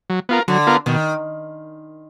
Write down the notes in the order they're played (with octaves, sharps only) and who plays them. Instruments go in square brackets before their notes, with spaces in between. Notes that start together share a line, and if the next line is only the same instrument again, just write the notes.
[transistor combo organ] F#3
B3 F4 A#4
[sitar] D3 [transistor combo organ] F#3
[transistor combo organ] B3 F4 A#4
[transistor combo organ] B2 [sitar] D#3